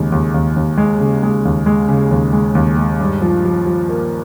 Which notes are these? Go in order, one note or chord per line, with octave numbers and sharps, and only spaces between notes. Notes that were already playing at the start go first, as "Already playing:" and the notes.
Already playing: D#2 C#3 G#3
D#2
D#2
D#2
G#3
C#3
G#3
D#2
G#3
C#3
D#2
G#3
D#2
G#3
G2
F3
F3
F3
A#3